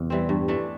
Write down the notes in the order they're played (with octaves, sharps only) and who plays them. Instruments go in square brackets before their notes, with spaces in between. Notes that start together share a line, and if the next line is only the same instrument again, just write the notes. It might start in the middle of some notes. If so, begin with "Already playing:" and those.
Already playing: [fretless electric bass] E2 [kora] C3
[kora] E3 G3 C4
G2
E3 A3 D4